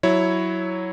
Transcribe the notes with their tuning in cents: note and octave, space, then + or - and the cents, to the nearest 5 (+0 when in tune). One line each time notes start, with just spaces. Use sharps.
F#3 +0 E4 +0 C#5 +0